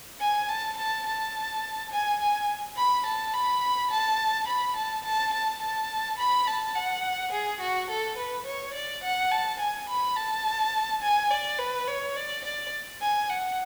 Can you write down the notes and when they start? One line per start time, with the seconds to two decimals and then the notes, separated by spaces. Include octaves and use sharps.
0.20 G#5
0.49 A5
0.77 A5
1.06 A5
1.91 G#5
2.20 G#5
2.77 B5
3.06 A5
3.34 B5
3.91 A5
4.47 B5
4.76 A5
5.05 A5
5.33 A5
5.62 A5
6.18 B5
6.47 A5
6.76 F#5
7.32 G#4
7.60 F#4
7.90 A4
8.18 B4
8.46 C#5
8.74 D5
9.03 F#5
9.31 A5
9.59 G#5
9.89 B5
10.16 A5
11.02 G#5
11.30 D5
11.59 B4
11.87 C#5
12.16 D5
12.44 D5
13.01 G#5
13.29 F#5